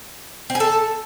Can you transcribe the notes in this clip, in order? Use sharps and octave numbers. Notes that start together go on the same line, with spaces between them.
C4
G#4
A4